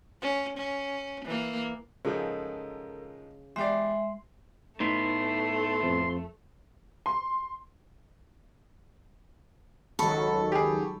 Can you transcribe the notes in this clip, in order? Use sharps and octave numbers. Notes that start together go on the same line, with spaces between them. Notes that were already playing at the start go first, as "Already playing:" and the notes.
C#4
C#4
E3 A#3
G#2 C#3 F3 G#3 A4 A#4
E2 G#3 G4 D5 E5 C6 C7
A2 A3 B3 D#4 C6
F2 F3
C6
C#2 D#3 F#3 A4 A5 B5 C#6
G4 G#4